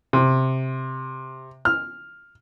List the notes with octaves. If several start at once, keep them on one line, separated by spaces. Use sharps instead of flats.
C3
F6